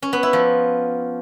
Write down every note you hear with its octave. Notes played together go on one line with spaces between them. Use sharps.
C#4
B3
E4
F3